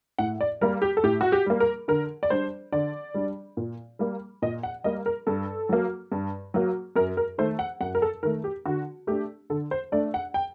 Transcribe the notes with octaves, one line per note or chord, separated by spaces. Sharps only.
A2 F#5
D5
G3 A#3 A#4
G4
A4
A2 G4
F#4
G4
G3 A#3
A#4
D3 A#4
D5
G3 D4 C5
D3 D5
G3 D4
A#2
G3 A#3
A#2 D#5
F#5
G3 A#3 D#5
A#4
G2 A4
F#3 A#3
G2
F#3 A#3
F#2 A#4
A#4
D#3 A3 C5
F#5
F#2 F#5
A#4
A4
D#3 A3 A#4
G4
D3 F#4
A3 D4 G4
D3 A4
C5
A3 D4 D5
F#5
G5